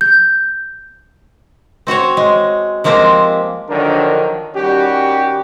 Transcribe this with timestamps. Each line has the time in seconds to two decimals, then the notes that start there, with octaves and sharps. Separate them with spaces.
0.01 G6
1.87 C4 F#4 C5 C#5
2.17 G#3
2.84 F3 G#3 A#3 C4 G4 C5
3.70 D3 D#3 F3 F#3 D4 A#4
4.55 D#3 G3 C#4 F#4 G4